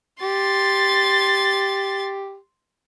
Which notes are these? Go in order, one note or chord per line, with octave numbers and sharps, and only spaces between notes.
G4 C6 A6